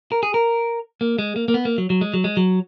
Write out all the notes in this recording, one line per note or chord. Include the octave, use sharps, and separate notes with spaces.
A#4
G#4
A#4
A#3
G#3
A#3
A#3
B3
A#3
F#3
F#3
G#3
F#3
G#3
F#3